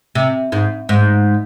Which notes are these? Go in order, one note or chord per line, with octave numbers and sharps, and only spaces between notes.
C3
G#2
G#2